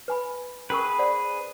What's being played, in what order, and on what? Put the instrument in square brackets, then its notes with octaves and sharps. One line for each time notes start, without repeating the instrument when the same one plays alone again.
[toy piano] B4 G#5 B5
[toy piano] C#4 A#4 C#6 [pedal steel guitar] G#4 B4
[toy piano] C5 D5 F#5